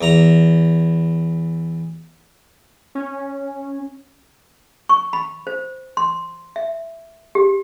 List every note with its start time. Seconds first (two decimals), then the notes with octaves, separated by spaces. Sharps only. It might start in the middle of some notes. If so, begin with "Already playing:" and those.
0.01 E2 A#5
2.95 C#4
4.89 C#6
5.13 B5
5.47 C5
5.97 C6
6.56 E5
7.35 G4